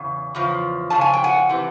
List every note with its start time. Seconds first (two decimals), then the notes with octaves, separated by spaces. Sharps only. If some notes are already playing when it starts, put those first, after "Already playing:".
Already playing: E2 C#3
0.35 E2 C#3 F3
0.90 E2 C#3 F3 A5
1.01 G#5
1.14 G5
1.24 F#5 G#5
1.49 C3 E3